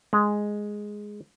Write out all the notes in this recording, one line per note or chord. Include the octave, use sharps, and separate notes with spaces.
G#3